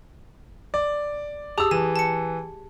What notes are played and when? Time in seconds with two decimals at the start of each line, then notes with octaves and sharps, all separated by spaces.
0.74 D5
1.58 G4 G#4 A5 D#6 E6
1.71 E3 A5 D#7
1.96 A5 C#7